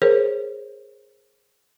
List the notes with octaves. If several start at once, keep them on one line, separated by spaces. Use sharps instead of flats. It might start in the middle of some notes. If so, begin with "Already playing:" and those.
G#4 A#4 C5 C#5